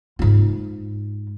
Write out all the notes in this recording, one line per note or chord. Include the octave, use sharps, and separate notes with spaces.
G#2 F4